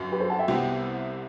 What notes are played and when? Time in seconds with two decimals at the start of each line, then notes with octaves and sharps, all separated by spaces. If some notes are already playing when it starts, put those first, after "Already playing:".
Already playing: G1 F#2 F#3
0.12 G4 B4
0.20 A4 C5
0.30 F#5 A5
0.39 E5 G5
0.48 C2 C3 G3 B3 E4